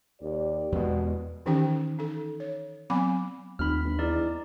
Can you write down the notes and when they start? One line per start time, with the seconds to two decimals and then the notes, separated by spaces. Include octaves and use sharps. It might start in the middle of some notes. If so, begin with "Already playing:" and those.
0.21 D#2 G4 D5
0.72 E2 B2 G#3
1.46 D#3 E3 C#4 D#4 G4 G5
1.99 D#4 A4
2.40 C#5
2.90 F#3 B3 C4 G#5 B5 D6
3.59 F1 D#2 B5 F6
3.84 G1
3.99 E2 D#4 D5